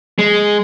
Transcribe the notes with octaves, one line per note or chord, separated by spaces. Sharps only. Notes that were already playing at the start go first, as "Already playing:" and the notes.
G#3